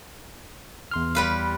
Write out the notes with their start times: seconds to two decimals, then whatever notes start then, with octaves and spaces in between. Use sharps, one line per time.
0.91 E2 C6 F6
1.15 G3 B4 F5